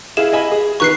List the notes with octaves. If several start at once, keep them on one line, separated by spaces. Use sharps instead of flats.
E4 G#4 F5 E7
D#5 G#5 B5
G#4
D#3 B4 A#5 C#6 F#6 C7